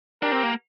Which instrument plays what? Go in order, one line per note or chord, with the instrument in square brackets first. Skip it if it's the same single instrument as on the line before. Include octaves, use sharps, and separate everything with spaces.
[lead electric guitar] D4 [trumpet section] G4 A#4
[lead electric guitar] C4
A#3